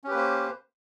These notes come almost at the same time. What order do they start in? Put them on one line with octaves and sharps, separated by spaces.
C#4 G4 B4 A#3 C5